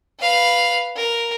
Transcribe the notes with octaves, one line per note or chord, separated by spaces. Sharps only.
B4 F5
A#4